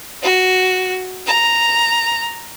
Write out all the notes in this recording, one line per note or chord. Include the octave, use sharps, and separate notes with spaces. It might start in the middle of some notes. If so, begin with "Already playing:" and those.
F#4
A#5